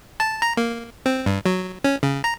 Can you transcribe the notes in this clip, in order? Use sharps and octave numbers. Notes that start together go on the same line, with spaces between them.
A5
A#5
A#3
C4
G2
F#3
C#4
C#3
A#5